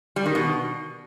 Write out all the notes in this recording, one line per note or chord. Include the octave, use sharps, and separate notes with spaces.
G3
D#3
B2